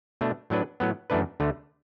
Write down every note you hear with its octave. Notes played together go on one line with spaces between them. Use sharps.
B2 A3 D4
A2 F#3 D4 B4
A2 F#3 B3
F#2 E3 A3 D4 B4
D2 D3 A3